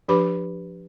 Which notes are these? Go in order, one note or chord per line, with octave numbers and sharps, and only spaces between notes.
F3 D4 G4 B4 B5 D6